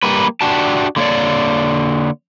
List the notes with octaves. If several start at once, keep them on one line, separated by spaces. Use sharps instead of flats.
G3 A#3 B4
D4 F#4 G4 A5
D3 A#3 C#5 D5